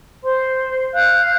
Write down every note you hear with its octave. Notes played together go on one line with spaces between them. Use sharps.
C5 C6
F5 F#6 G6